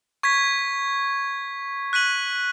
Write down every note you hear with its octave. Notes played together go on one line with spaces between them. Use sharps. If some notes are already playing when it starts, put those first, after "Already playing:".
C#6 G#6 B6
F#6 B6 D#7 F#7